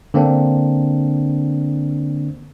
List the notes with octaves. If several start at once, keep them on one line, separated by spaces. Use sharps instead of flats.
D3 A#3 C4 D4